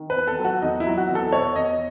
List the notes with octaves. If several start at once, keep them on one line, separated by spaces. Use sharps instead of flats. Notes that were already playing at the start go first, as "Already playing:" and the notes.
Already playing: D#3
B4
E2
A4
F#3
F#4
E2 D#4
E4
F#3
F#4
E2
A4
B2 C#5
E2 D#5